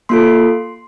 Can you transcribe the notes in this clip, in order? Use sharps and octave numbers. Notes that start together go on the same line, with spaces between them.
A#3 F4 A4 C6